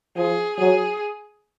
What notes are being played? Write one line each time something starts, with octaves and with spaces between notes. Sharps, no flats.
F3 G#4
F#3 G#4